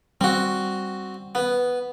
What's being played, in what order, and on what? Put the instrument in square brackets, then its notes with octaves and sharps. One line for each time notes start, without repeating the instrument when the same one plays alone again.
[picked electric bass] G3 [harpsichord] C4 F#4
[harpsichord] B3